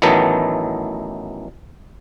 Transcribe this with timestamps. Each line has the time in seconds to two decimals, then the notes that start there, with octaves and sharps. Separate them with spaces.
0.02 A1 D#3 E3 F#3 B3 A4